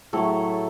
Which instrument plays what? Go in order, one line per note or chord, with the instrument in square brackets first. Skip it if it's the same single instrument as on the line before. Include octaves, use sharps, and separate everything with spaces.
[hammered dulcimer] A2 F#3 A3 A4